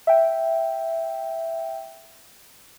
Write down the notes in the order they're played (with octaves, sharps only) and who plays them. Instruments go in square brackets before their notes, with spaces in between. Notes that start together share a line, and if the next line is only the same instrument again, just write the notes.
[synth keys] E5 G5